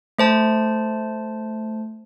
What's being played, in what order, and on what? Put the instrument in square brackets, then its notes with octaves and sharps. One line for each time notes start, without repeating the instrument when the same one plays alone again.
[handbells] A3 C5 A5